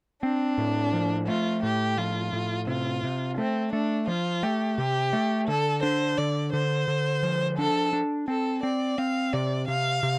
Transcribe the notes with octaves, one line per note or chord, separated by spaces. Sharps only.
C4 D4
A2
F3
A3 F4
A2 G4
F3 F4
A2
C3 F4
C3
A3 C4
A3 D4
F3 F4
A3 G4
C3 G4
A3
D3 A4
D4 C5
D3 D5
D3 C5
D3
F3
D4 A4
D4
C4 A4
C4 D5
C4 F5
C3 D5
C3 F5
C3